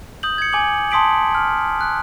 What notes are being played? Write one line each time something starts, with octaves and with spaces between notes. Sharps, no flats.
D#6 G6 F#7
G#6 C#7
G#5 D6 F#7
A5 C6 D#6 B6 D7 F#7
F6
F#6